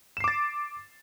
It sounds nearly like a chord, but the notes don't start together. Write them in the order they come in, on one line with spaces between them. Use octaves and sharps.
E7 C7 D6 A6